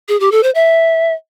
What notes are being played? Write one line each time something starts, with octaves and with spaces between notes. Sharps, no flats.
G#4
G4
A4
C5
E5